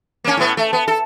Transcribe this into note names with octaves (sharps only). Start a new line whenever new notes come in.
A#3 C#4
A2 B3
A3
B3
A4